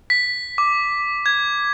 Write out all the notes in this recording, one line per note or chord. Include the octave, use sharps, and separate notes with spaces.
B6
D6
G#6